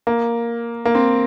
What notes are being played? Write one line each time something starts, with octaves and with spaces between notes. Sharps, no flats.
A#3
A#3
C4